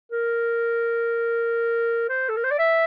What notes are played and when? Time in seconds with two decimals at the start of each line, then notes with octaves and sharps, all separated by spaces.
0.12 A#4
2.09 C5
2.29 A4
2.36 A#4
2.44 C5
2.51 D5
2.59 E5